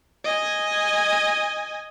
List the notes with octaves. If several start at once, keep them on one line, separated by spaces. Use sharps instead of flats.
D#5 G#5